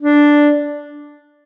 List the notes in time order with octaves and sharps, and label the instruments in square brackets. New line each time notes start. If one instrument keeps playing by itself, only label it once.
[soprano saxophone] D4